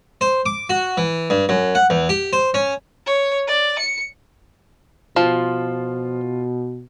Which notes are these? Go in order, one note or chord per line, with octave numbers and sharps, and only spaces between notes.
C5
D6
F#4
E3
G2
F#2
F#5
E2
G4
C5
C#4
C#5
D5
C#7
B2 F3 F4